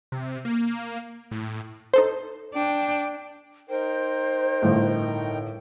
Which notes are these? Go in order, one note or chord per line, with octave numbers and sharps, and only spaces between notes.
C3
A#3
A2
D#4 A4 C5
D4 G5
D#4 A#4 C5 G5
G1 A2